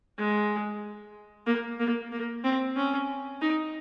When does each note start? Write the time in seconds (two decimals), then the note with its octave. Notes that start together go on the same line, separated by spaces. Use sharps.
0.19 G#3
1.47 A#3
1.80 A#3
2.12 A#3
2.44 C4
2.76 C#4
3.42 D#4